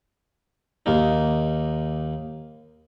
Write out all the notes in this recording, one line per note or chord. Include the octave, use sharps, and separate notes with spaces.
D#2 A#3 D#4